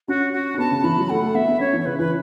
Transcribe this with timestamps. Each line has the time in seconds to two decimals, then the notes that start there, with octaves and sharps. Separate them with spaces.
0.08 C#4 F#4
0.33 F#4
0.54 C#4
0.58 B3 A5
0.71 C#3
0.84 E3 B5
0.97 F#3
1.09 A3 F#5
1.22 A3
1.34 B3 E5
1.48 B3
1.60 C#4 C#5
1.73 E3
1.80 C#5
1.85 C#3 B4
1.99 E3 B4